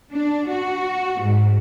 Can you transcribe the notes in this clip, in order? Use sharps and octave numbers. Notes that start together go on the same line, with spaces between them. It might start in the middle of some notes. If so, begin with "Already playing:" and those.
D4
F#4
G#2